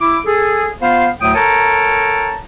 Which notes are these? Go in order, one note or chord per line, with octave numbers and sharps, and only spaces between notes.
E4 D6
G#4 A4
B3 F4 C5 F5
D2 A2 F#3 G5 D#6
A4 A#4 C#5 G5 A5 A#5